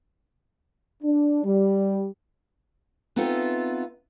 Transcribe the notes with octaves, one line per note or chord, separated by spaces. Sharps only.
D4
G3
B3 C4 D#4 F4 A4 E5